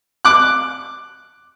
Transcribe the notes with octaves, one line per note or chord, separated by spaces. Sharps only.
D6 F#6